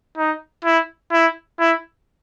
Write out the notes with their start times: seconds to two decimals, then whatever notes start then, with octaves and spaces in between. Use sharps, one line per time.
0.18 D#4
0.65 E4
1.12 E4
1.59 E4